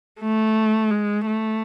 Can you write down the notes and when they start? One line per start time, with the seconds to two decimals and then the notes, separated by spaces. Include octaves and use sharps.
0.21 A3
0.91 G#3
1.27 A3